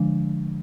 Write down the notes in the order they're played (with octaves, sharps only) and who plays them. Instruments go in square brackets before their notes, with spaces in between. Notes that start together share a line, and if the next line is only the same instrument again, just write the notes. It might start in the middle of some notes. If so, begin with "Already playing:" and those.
Already playing: [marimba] D3 F3 G#3 D4